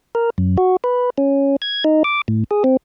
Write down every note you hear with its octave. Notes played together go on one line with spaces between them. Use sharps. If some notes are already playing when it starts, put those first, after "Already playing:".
A#4
F#2
F#4
B4
C#4
G#6
D#4
D6
A2
G#4
C4